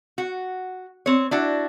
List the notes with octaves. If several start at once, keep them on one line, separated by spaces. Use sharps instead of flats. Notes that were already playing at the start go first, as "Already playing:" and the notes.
F#4
C4 C#5
D4 E4 F#4